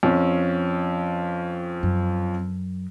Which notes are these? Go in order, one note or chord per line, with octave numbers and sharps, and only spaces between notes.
F2 F3 C#4
F#2